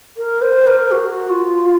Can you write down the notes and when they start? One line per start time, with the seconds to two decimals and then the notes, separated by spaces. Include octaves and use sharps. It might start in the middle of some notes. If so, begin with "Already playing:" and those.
0.17 A#4
0.42 C5
0.67 A#4
0.91 F#4
1.29 F4